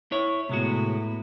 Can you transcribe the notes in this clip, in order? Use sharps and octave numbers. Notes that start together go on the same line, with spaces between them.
E4 C#5
A2 C3 G#3 B3 F#4